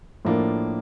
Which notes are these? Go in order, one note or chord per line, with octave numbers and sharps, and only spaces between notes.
A2 F3 A#3 D4